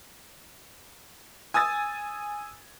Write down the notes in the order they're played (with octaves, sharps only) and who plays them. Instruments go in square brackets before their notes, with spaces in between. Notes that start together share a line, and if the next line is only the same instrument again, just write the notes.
[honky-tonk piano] G#5 D#6 E6 G#6 A6